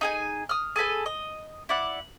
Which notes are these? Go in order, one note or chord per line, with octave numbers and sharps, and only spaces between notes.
D#4 G#4 G#5
D#6 F6
G#4 A4 B4 G#5
D#5
E4 D5 F#5